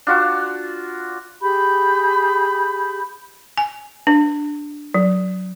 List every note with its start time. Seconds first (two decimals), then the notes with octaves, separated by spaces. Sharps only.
0.07 D4 F4 F#4
1.41 G4 G#4 B5 G6
3.58 G#5
4.07 D4
4.94 F#3